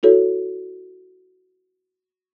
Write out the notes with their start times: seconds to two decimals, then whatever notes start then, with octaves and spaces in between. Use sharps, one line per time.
0.03 E4 F#4 A4 C#5